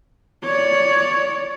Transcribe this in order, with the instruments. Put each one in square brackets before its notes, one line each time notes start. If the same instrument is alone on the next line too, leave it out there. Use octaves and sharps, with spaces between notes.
[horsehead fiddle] C#5 D5